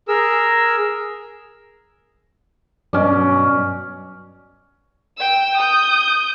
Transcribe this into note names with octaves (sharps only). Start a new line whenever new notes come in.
G#4 A#4 E6
G2 B2 F#3 C#4 D5
G5 E6
D#6 G6